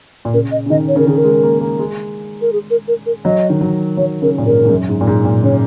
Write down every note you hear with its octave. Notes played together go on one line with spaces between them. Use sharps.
A#2
C#3 A#4
D#5
C#3
D#3 D#5
C#5
C#3 A#4
D#3 G#4
A#4
G#3
A#3
A#3
G#3
A#4
G#4
A#4
A#4
A#4
F#3 D#5
D#3
F#3
F#3 C#5
C#3 A#4
A#2
G#2 A#4
G#2
F#2
G#2
A#2
G#2
A#2
C#3 C#5